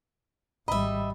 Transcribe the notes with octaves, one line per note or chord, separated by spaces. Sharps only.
G#1 G3 D#5 E5 B5